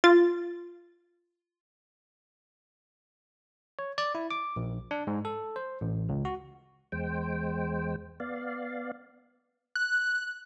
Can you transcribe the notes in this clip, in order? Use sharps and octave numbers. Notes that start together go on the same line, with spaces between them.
F4 A6
C#5
D5
E4
D6
A#1
D4
G#2
A4
C5
A1
C#2
F#4
E2 G#3 C5 G5
B3 D5 F5
F#6